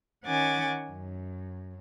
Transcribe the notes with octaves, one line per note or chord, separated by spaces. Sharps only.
D#3 C#4 F#5 G#5 D6 A6
F#2